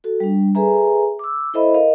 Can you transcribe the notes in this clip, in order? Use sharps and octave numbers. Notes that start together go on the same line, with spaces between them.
F#4 A4
G3 D4
G#4 A4 B4 E5 G#5 A#5
D6 E6
E4 A4 C5 D#5 E5 B5
A#4 D#5 F5